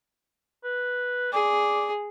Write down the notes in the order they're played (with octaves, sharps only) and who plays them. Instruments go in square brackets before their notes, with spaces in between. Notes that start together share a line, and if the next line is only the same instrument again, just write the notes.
[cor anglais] B4
[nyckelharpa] G#4 [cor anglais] D5